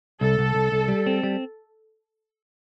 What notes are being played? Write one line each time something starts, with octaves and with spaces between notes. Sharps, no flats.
C2 A4
C2
C2
C2
G3
C4
G3